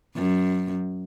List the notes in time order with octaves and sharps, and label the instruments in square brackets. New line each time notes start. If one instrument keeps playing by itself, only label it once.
[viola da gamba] F#2